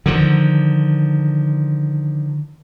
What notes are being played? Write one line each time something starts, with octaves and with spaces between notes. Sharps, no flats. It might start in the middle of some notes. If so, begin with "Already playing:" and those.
D3 D#3 F3